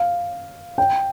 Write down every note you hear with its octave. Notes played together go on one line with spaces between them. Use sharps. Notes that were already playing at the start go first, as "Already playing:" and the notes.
Already playing: F5
G5